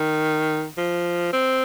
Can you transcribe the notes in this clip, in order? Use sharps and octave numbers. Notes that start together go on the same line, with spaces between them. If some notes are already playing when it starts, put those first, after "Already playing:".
Already playing: D#3
F3
C4